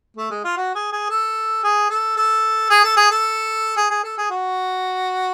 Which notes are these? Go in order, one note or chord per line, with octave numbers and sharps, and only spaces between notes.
A3
G#3
F4
F#4
G#4
G#4
A4
G#4
A4
A4
G#4
A4
G#4
A4
G#4
G#4
A4
G#4
F#4